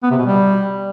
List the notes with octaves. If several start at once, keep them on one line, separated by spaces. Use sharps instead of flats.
B3
C3
B2
G3